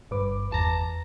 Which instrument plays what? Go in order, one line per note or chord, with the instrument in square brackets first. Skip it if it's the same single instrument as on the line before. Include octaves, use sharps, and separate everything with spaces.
[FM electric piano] G1 B4 D6 [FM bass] G2
[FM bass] E2 [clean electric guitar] A5 A#5